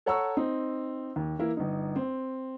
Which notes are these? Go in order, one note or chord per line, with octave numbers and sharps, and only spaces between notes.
A4 C#5 F#5 A#5 C#6 E6
C4 D#4
D#2
E3 A#3 E4
G1 D#4
C4